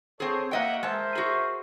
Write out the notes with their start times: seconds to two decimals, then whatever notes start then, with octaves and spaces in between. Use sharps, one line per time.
0.20 C4 G#4 A4 C5 C#5
0.51 A#3 F#4 D#5 E5 F#5 G5
0.83 G#3 A#4 C5 E5 A5
1.16 F#4 G#4